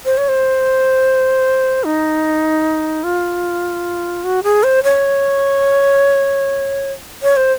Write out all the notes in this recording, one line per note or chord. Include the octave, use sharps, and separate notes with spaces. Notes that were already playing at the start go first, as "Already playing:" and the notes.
C5
C#5
C5
D#4
F4
F#4
G#4
C5
C#5
C#5
C5